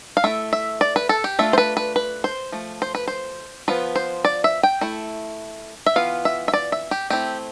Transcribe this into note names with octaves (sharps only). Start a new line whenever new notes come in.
F5
A3 E4 E5
E5
D5
B4
A4
G4
A3 D4 F4 E5
C5
B4
B4
B4
C5
F3 A3
C5
B4
C5
F3 B3 F4 B4
C5
D5
E5
G5
A3 E4
E5
E3 B3 F4 F5
E5
E5
D5
E5
G4
A3 C4 E4 G4